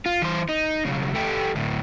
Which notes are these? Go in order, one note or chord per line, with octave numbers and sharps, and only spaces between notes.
F4
E3 C5
D#4
B1 C#3
A3 G4
D2 A2